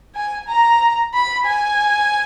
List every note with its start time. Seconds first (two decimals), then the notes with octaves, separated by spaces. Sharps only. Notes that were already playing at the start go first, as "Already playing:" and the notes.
0.15 G#5
0.48 A#5
1.14 B5
1.46 G#5